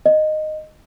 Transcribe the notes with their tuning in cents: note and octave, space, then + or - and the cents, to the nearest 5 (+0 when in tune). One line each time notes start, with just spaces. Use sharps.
D#5 -10